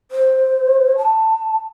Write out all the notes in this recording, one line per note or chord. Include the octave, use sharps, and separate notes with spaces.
C5
A5